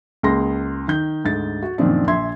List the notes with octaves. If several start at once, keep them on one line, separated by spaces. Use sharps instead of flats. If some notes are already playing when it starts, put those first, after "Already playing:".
C#2 A#3 G#4 C6 A#6
D#3 G6
D2 G#2 A6
F#4
F#2 A#2 D#3 F3 C4 D4
A#1 E5 C6 G#6